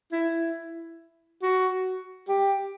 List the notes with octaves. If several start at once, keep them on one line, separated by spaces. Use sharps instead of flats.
E4
F#4
G4